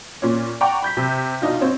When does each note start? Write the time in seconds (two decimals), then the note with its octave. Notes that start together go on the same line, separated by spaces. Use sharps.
0.22 A#2 C#4
0.61 D5 F#5 G5 A#5 C#6 D6
0.82 B5 G6 B6
0.97 C3
1.42 B2 D4 D#4 F4
1.61 C4 C5 C#5